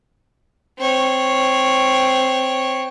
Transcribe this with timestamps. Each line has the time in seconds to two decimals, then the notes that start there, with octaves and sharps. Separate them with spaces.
0.78 C4 C#5